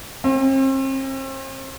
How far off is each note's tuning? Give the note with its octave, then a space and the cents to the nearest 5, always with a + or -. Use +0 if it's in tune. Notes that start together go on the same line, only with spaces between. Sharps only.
C4 +40